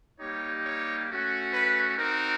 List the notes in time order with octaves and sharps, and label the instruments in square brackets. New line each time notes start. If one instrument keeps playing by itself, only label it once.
[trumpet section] G3 A#3 D#4 G4 C#5
C#5
A3 C#4 F#4
B4
C4 D#4 F#4 A#4